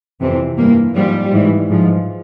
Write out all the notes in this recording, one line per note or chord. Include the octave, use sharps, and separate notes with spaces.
F2 C3 E3 C4
G2 E3 A#3
G#2 F3 G3
G#2 E3
G#2 F3